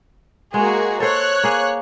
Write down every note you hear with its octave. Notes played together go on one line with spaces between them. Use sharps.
G#3 A#3 F#4 G#4
A4 C5 C#5 F#6
A#3 G#4